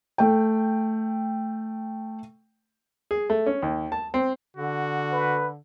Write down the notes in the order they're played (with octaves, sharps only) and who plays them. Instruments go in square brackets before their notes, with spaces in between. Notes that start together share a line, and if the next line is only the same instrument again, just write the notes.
[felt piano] A3 G5
[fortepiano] G#4
A3
C#4
D#2
A5
C4
[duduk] D3 [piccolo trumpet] F#4
[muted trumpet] B4